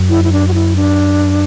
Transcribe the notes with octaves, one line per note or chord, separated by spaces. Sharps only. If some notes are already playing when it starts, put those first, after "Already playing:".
Already playing: F#2
E4
E4
D4
F#4
E4
D4